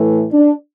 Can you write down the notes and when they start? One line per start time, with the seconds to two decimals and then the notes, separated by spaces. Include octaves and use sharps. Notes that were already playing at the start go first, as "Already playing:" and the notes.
Already playing: A2 E3 A3
0.32 D4